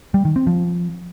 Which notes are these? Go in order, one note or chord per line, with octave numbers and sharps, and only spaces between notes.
G3
D#3
C4
F3